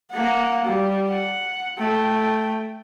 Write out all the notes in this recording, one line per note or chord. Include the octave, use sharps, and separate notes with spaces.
A#3 F#5
G3
F#5
A3 G5